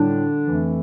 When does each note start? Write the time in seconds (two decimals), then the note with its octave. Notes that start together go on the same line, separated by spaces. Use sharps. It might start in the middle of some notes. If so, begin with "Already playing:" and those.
Already playing: A2 D3 G3 D4
0.43 F2 E3 A3